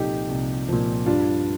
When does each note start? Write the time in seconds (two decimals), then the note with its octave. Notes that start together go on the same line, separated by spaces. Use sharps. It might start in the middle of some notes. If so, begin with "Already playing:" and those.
Already playing: C2 A#2 F3 D#4 G4 A4
0.30 C2
0.68 A#2 F3
1.06 G2 D4 F4